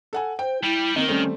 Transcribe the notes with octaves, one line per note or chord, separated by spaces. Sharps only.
A4 F#5 G#5
C5 G5
G3 E4
D#3 A#3 C4 D#4
G3 A3 C4 C#4